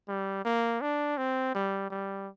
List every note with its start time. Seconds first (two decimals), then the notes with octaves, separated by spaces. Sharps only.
0.08 G3
0.45 A#3
0.81 D4
1.17 C4
1.55 G3
1.90 G3